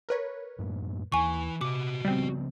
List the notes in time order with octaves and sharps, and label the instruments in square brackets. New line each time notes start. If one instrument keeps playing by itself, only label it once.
[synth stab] A#4 B4 C#5
[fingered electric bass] F#2 A2 A#3
[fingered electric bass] D#2 [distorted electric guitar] E3 [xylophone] G#5 C#6
[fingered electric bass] C3 [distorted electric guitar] F#4 D#5 [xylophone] D6
[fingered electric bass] C#3 F3 B3 [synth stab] G3 C4